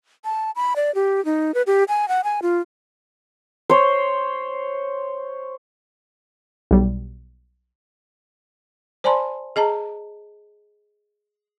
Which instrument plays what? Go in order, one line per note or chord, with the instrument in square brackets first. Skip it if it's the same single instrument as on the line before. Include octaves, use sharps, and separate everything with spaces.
[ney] A5
B5
D5
G4
D#4
B4
G4
G#5
F#5
G#5
F4
[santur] C5 C#5
[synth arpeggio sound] B1 G3
[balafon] C5 D5 G#5 A5 B5 C6
G#4 D#5 A5 A#5